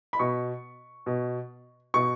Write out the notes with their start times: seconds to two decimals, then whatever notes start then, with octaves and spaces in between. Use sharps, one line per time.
0.13 B5
0.19 B2 C#6
1.06 B2
1.94 B2 C#6